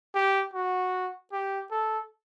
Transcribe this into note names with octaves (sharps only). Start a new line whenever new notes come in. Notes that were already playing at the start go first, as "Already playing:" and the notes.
G4
F#4
G4
A4